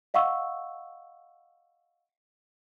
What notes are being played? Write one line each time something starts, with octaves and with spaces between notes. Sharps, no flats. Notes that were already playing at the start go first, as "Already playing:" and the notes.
D#5 F5 F#5 C#6 E6